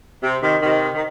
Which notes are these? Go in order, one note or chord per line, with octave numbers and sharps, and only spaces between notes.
C3
C3 D#3
C3 D#3
D#3